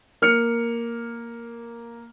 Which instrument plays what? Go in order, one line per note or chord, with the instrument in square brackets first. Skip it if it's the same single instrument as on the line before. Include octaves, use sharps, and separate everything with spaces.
[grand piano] A#3 F6 C#7